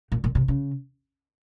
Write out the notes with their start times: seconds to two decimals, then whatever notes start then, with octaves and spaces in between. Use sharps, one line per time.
0.12 A#2
0.24 A#2
0.35 C3
0.48 C#3